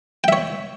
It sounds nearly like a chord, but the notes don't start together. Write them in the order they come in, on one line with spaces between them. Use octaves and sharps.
G5 E5 C#5